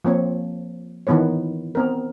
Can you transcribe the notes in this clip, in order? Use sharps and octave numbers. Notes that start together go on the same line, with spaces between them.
F3 A#3 C4 C#5
D#3 E3 B3 B4 C#5
B3 C4 A#4